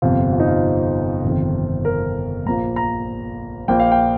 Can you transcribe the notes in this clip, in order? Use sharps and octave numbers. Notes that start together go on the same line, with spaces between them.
G1 F2 C3 F4
F4
D#4
F4
G1 F2 C3 D#3
A#4
A#1 A#2 A#3 A#5
A#5
A#1 A#2 A#3 G5
F5
G5